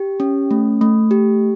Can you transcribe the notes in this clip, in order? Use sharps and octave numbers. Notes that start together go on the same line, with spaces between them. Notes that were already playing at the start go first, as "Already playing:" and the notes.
Already playing: G4
C#4
A3
A3
G4